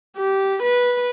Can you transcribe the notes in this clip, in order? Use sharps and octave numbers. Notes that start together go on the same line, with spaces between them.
G4
B4